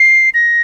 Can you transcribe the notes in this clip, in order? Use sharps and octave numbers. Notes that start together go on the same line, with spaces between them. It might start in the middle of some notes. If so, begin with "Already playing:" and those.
Already playing: C7
A#6